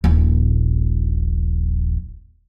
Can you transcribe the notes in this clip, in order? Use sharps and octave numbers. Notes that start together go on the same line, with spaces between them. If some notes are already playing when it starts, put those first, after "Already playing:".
D#1 A#1